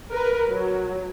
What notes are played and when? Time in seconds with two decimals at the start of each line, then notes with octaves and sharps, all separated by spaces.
0.12 A#4 B4
0.50 F#3